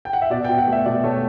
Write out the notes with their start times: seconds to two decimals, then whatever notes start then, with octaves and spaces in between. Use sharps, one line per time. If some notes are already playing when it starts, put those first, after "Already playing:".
0.05 G5
0.13 F#5
0.22 E5
0.30 B2 D5
0.45 G5
0.49 B2
0.58 F#5
0.67 A3
0.72 E5
0.86 B2 D5
1.03 A3 C#5